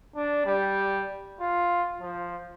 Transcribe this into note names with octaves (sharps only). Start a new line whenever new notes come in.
D4
G3
F4
F3